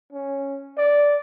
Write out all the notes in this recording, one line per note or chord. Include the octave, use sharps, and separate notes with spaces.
C#4
D5